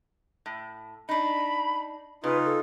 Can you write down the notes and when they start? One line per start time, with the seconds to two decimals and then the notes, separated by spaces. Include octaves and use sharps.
0.46 A2
1.09 D4 D#4 B5
2.24 C#3 D#4 F4 B4
2.45 A4